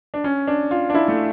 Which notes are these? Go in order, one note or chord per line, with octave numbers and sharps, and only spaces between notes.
D4
C#4
D4
F4
D4
E4
A3